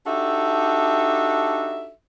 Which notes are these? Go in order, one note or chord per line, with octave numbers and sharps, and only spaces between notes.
D4 D#4 F#4 G4 A4 E5